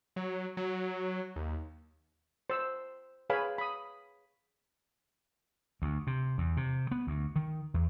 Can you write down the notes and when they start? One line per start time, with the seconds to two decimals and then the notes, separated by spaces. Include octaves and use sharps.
0.16 F#3
0.57 F#3
1.36 D#2
2.50 C5 E6
3.30 G#4 B4 C#5 F5 G#5 B5
3.58 B5 D#6
5.82 D2
6.07 C3
6.38 E2
6.57 C3
6.91 B3
7.07 D2
7.36 D#3
7.74 E2